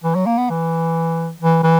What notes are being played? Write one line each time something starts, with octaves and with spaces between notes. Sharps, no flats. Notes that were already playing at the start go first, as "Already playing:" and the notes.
E3
F#3
A#3
B3
E3
E3
E3